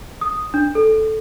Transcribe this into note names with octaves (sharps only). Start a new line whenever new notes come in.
D#6
D4
A4